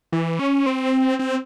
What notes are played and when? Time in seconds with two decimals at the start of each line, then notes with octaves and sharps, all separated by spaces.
0.12 E3
0.39 C#4
0.66 C4
1.19 C4